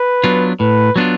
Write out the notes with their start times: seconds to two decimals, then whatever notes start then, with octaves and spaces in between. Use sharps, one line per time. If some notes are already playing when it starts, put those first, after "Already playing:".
Already playing: B4
0.24 F#3 B3 D4 F4
0.60 A2 B4
0.96 F#3 B3 D4 F4